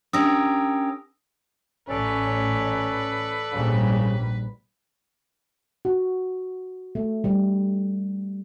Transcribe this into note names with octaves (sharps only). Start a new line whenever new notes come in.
C#4 D4 G4 A#4 D#6 E6 A#6
A1 C#4 A4 B4 D5
A#1 G#2 C#3 G3
F#4
A3
G3